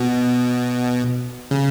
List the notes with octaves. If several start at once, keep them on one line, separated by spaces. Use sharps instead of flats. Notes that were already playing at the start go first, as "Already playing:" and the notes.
Already playing: B2
C#3